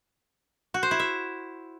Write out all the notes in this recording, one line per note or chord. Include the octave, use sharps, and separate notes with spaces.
F#4
C5
E4
E5